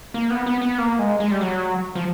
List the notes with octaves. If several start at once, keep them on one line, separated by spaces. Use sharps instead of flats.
A#3
B3
B3
B3
A#3
G#3
G#3
G3
F#3
F3